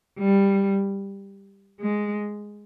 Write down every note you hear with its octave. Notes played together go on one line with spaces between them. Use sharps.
G3
G#3